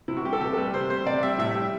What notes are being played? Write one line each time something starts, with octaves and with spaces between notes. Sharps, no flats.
C3 E4
F#4
G3 G4
A4
C3 G4
A4
G3 B4
C3 C5
G3 C5
C3 D5
G3 E5
A2 E5
G3